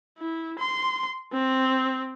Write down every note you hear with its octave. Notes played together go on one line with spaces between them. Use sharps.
E4
C6
C4